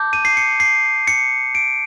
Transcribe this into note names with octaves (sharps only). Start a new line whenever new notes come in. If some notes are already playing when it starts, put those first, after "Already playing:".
Already playing: A5 D6 G6
D#7
C7
C#7
C7
C#7
D7